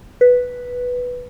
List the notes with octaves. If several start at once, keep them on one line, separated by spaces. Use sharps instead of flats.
B4